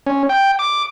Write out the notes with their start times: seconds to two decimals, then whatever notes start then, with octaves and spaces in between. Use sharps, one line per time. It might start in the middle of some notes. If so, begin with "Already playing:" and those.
0.06 C#4
0.29 G5
0.59 D6